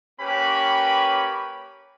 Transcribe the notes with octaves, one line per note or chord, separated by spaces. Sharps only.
A#3 C#4 G4 B4 B5 C#6